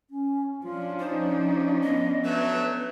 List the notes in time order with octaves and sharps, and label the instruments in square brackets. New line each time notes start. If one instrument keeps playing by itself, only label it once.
[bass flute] C#4
[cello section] F3 C#4 D4 [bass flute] F4
[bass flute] D#4 [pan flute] C5
[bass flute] B3 [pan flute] D#5
[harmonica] F#3 A3 E5 [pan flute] B4